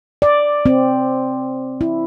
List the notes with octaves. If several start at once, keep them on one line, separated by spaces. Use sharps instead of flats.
D5
C4
E4